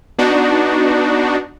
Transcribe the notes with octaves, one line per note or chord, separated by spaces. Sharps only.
B3 D4 D#4 F#4